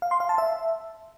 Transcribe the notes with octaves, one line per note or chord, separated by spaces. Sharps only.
F5
C6
F5
A5
E5